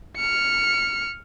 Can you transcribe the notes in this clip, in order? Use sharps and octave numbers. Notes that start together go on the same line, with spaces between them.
F6 C#7